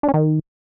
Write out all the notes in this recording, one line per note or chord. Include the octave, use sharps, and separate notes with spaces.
D4
C#4
D#3